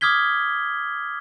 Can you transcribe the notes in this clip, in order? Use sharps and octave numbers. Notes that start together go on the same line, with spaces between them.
D6 D#6 F6 G#6 B6 G7